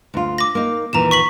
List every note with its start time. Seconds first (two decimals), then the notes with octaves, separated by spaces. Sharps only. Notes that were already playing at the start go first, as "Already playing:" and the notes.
0.14 D2 F4
0.38 D6 A#6
0.55 A#3 D#4
0.93 D#2 A#2 E3 A#5 E7
1.11 C#6 B6 F#7